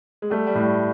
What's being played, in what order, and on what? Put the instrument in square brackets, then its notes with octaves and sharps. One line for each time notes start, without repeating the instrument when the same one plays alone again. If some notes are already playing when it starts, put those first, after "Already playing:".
[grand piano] G#3
[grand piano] G3 [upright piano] A3
[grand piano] G3
[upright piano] A2
[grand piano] G3